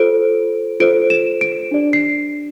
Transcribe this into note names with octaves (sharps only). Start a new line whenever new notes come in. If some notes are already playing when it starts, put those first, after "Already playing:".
Already playing: F4 A4 C5 D7
F4 A4 C5 D7
E7
D7
D4 G4 D5
C7